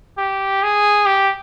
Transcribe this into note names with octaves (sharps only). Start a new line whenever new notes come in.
G4
G#4
G4